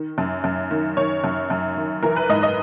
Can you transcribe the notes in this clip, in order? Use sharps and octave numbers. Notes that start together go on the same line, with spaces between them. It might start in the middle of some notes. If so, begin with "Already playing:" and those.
Already playing: D#3
F#2
F#2
D#3
D#3 C#5
F#2
F#2
D#3
E3 A#4
B4
G#2 D#5
D#5